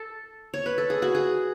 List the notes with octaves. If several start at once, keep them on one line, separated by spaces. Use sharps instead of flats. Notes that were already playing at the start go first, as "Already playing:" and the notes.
Already playing: A4
C#5
B4
A4
G#4
F#4
G#4